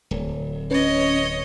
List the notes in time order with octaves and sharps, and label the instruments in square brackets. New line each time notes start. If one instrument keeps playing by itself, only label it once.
[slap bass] D1
[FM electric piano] C#4 B4 [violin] C#5 D#5